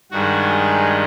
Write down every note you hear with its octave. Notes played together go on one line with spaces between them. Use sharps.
G2 D#3 G#3 F#4
G#4